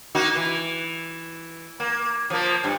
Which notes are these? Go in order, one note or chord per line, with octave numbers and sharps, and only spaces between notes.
A#3 D#4 F#4
E3
A#3
F3 A#3
G2